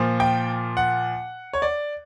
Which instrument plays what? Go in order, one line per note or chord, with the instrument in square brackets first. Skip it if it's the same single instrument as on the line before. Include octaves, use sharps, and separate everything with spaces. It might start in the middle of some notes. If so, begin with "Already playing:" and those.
Already playing: [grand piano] A#2 F3
G5
F#5
C#5
D5